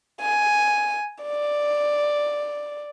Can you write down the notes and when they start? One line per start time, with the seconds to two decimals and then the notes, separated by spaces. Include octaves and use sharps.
0.21 G#5
1.24 D5